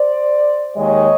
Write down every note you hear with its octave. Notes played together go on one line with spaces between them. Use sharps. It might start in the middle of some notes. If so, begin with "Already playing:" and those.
Already playing: C5 D5
D#2 D#3 G#3 C#5 D#5